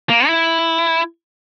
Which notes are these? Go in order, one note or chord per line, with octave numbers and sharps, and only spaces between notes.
A#3
E4